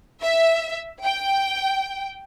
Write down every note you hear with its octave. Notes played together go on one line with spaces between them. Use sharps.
E5
G5